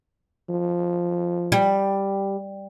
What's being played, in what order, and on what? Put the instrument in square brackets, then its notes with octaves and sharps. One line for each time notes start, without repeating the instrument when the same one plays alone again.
[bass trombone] F3
[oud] G3